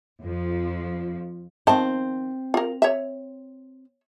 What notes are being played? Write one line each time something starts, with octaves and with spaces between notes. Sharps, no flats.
F2 F3
D#3 F3 C4 C5 A5
F4 A#4
C#5 E5